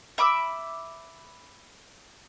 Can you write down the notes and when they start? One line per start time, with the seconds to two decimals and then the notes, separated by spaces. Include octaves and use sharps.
0.18 E5 B5 D6 E6